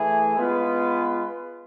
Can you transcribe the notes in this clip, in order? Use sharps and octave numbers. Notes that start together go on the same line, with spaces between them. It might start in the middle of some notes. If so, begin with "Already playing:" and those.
Already playing: E3 A3 E4 G#4
G#3 B3 F4 B4